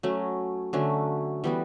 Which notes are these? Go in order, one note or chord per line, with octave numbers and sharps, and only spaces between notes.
F#3 A3 C#4
D3 F#3 A3 C#4
E3 G3 B3 F#4